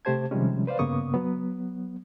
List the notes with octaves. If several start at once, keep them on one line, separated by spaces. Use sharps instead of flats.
C3 A3 G4 C5 A5 G#6
C3 D#3 F3 G3 G#3 C#4
B4 C5 D5 F5
G2 C#3 A#3 B3 C#6 D#6
F#3 B3